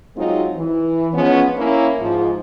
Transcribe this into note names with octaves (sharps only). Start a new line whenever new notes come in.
F#3 G#3 C4 D#4 F4
E3
F3 G#3 B3 C#4
A#3 C#4 E4
G#2 F3